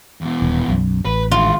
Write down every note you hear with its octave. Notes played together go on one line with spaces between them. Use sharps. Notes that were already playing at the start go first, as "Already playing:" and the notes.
E2 B2
D#1
B1 F#2
A1 B4
D#3 G#3 F4